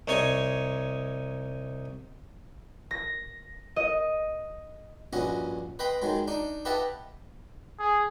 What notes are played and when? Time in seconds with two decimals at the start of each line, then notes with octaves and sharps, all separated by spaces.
0.08 C2 D#4 C#5 G#5 C#6
2.91 A#6
3.76 D#5
5.13 A#1 G2 C#4 F#4 D#5
5.79 B4 D#5 G5 B5 C6
6.02 D#3 F#3 G#3
6.28 D4 D#4
6.65 G4 B4 D#5 E5 F#5 A5
7.79 G#4